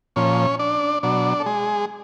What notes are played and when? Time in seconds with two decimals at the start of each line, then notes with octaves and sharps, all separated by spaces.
0.16 A#2 F3 C#4 C#5
0.59 D4 D5
1.03 B2 F#3 D4 D5
1.40 A4
1.46 G#3 G#4